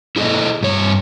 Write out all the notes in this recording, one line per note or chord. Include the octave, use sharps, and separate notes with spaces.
E4 G#4 A4 D#5
G2 C#5